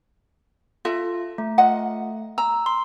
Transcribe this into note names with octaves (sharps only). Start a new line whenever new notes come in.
F4 A4 E5
A3
F4 D#5 F#5
A#5 E6
C6